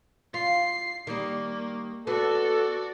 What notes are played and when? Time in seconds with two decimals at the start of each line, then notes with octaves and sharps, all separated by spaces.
0.34 F4 C7
1.07 D#3 G3 A#3
2.07 B3 F#4 A4 D5